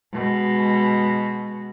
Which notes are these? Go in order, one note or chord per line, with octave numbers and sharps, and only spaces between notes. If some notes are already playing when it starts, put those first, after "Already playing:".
B2 G#3